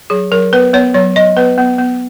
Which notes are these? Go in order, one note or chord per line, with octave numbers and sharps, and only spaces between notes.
F#3 G#4
F#3 A#4
B3 B4
B3 C#5
F#3 C#5
F#3 D#5
B3 B4
B3
B3